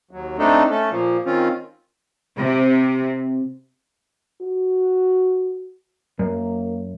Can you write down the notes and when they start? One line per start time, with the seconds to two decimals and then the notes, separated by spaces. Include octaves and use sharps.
0.11 D#2 F#3
0.38 A3 C4 D4 D#4 A4
0.70 A3 C#4 A4
0.90 A#2 F3 A#3
1.25 D#3 C4 C#4 F4
2.37 C3
4.41 F#4
6.19 F#2 A#3